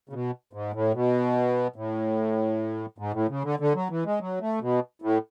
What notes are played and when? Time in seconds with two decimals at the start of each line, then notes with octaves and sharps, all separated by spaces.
0.09 C#3
0.13 B2
0.53 G#2
0.74 A2
0.94 B2
1.76 A2
2.98 G#2
3.13 A2
3.29 C#3
3.44 D3
3.60 D3
3.75 F#3
3.90 E3
4.05 G#3
4.21 F#3
4.41 A3
4.62 B2
5.02 A2